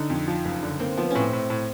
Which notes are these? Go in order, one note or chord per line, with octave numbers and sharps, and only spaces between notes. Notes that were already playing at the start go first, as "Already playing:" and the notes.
Already playing: D3 D#4
F2
F3
F#1
D3
A#3 C4
F3 B3
A2 C4 C#4
A2
A2